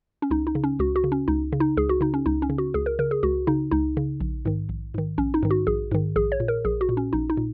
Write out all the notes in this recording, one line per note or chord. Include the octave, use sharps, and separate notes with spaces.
C#4
C#2 D#4
D#4
C#3
C#4
C#2 F#4
F#4
C#3
C#4
C#2 D#4
C#3
D#4
C#2 G#4
F#4
C#3 D#4
C#4
C#2 D#4
C#4
C#3
F#4
C#2 G#4
A#4
C#3 A#4
G#4
C#2 F#4
C#3 D#4
C#2 D#4
C#3
A#1
G#2 D#3
A#1
G#2 D#3
A#1 C#4
D#4
G#2 D#3
F#4
A#1 G#4
G#2 D#3
A#1 G#4
C#5
A#2
A#4
A#1 G#4
F#4
A#2
C#4
A#1 D#4
D#4
A#2